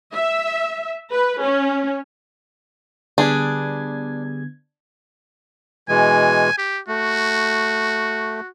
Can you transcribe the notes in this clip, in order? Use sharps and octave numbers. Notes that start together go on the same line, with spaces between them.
E5
B4
C#4
D3 G3 B3 D4 G#4 G#6
B2 E3 G#3 G#5
G4
A3 F#4